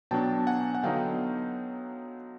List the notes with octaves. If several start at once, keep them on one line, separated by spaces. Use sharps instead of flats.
B2 F#3 B3 D4 G5 A5
F#5 G#5
F#5
D3 F#3 B3 D#4 F5 G5